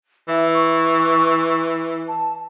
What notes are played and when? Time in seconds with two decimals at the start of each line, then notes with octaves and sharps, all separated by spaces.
0.28 E3 E5
0.54 C#6
2.08 A5